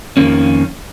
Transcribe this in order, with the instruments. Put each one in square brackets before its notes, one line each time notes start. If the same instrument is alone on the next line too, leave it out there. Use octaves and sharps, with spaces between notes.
[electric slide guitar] F2 D#3 A#3 C#4